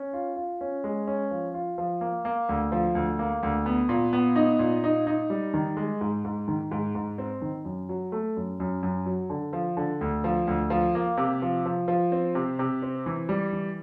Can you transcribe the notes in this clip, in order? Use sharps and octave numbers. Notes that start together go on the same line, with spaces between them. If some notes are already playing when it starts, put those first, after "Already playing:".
Already playing: C#4
F4
F4
C#4
G#3
C#4
F3
F4
F3
A#3
A#3
D2
F3
D2
A#3
D2
B3
A#2
B3
D#4
A#2
D#4
D#4
G3
D#3
G#3
G#2
G#2
D#3
G#2
G#2
C4
D#3
F#2
F#3
A3
F#2
F#2
F#2
F#3
D3
F3
D3
D2
F3
D2
F3
A#3
C3
F3
F3
F3
C4
C3
C3
C4
E3
G3
E3